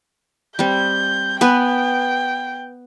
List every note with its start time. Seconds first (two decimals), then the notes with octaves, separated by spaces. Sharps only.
0.59 G3 C4 G6
1.41 B3 B4 G5 G#5